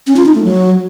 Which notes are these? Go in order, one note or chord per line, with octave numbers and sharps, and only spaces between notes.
C#4
F4
D#4
A3
F#3